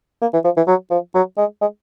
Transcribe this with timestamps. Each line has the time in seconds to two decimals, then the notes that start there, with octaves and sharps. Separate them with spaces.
0.21 A#3
0.33 E3
0.44 F3
0.57 E3
0.67 F#3
0.90 F3
1.15 F#3
1.38 G#3
1.61 G#3